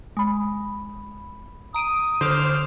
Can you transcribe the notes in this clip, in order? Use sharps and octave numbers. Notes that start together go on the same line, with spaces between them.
G#3 B5
A#5 D#6 D7 D#7
D3 C5 D6 F6